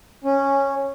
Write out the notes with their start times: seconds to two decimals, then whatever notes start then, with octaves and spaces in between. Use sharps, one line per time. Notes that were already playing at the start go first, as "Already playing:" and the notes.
0.24 C#4